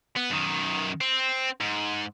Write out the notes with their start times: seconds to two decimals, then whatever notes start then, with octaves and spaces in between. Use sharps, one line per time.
0.16 B3
0.30 F#2 D#3
1.01 C4
1.61 G#2